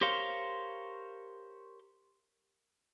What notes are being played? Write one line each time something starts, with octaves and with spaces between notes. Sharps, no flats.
G4 A#4 C5 C#5 F5